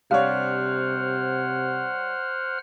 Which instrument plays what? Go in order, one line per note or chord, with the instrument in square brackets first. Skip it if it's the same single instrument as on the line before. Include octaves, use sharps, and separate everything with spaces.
[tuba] C3 [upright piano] G3 D4 C#5 [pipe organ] C5 F#5 F6 [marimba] F5